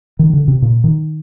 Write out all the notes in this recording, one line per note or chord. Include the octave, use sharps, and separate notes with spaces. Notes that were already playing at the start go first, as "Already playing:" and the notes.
D#3
D3
C3
A#2
D#3